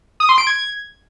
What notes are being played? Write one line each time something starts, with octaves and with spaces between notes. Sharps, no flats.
D#6
C6
D7
G#6